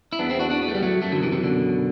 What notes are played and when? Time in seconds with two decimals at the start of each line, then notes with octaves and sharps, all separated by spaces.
0.13 E4
0.19 E2 B3 D4
0.30 C4 E4
0.40 D4 F#4
0.50 D4 F#4
0.61 B3
0.68 A3
0.75 G3
0.83 F#3 A3
1.02 F#2 F#3 A3
1.12 D3 F#3
1.22 C3 E3
1.32 C3 E3
1.43 B2 D3